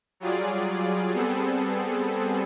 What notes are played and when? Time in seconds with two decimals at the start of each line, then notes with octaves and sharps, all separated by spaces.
0.20 F#3 G3 F4 G#4 D5
1.13 G3 B3 C4 G#4 A4